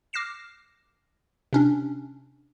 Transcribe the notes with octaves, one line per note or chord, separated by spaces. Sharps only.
D6 F6 A#6 C7 E7
C3 C#4 D4